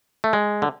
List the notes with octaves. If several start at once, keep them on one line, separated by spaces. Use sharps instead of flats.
A3
G#3
D3